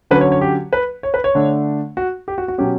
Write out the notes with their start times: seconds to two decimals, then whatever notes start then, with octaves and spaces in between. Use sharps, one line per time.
0.11 D3 F#3 C#4 B4
0.21 C#5
0.32 C#5
0.41 G4
0.73 B4
1.03 C#5
1.14 B4
1.24 C#5
1.35 D3 A3 D4
1.97 F#4
2.28 G4
2.38 F#4
2.48 F#4
2.58 B2 F#3 C#4 G4